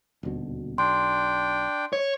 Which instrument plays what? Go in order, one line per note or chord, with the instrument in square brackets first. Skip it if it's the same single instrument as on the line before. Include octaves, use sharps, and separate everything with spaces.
[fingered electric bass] D#1 D2 B2
[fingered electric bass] B1 [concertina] D4 G5 [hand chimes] C6
[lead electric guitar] C#5